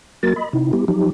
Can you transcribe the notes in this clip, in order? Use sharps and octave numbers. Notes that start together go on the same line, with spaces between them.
F#3 A#3 F#4 A#4 A6
D#5 B5
C3 D#4 E4
G3 B3 E4 G4
F3 F#3 D#4 G4